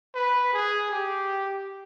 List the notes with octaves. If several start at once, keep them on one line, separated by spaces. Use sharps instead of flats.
B4
G#4
G4